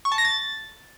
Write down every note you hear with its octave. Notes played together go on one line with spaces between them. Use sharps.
C#6
A5
A#6
A6